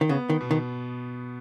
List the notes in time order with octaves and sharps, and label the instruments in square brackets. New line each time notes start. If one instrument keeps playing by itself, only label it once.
[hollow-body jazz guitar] D#3
[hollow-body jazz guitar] C#3 [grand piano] B3
[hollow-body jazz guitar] D#3
[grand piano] B2
[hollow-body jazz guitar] D#3